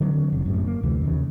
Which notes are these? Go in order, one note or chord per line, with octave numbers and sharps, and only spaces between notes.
D3 F#3 C4
F1 F2 C#3
F#2 A2 G3
A#3
D2 C3 E3 A3
D#2 C#3